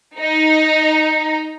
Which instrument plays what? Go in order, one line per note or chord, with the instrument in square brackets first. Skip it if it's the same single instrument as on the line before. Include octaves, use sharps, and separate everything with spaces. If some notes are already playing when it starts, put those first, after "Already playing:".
[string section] D#4